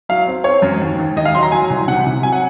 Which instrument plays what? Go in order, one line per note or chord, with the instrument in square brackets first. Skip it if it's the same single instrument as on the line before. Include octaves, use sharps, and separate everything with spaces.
[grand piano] F#3 F5
C4
C4 C#5
F#2
D#2
D#2
D#2 D#5
F5
F#3 C6
A#5
F#3 G#5
C2
C3 F#5
C3
F#3 G#5
F#5